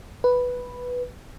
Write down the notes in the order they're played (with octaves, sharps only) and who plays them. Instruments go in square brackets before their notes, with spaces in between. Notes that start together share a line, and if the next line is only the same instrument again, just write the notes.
[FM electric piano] B4